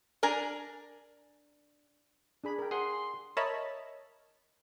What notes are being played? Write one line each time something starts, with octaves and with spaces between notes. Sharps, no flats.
D4 A#4 G#5 A#5
D4 G#4 B5
A#4 G5
G#4 F#5 C6
A#4 C#5 D#5 E5 A5 B5